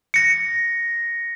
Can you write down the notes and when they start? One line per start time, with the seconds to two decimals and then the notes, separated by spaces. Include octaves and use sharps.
0.14 A#6 C#7